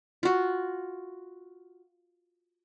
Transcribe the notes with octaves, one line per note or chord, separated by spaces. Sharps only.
F4 F#4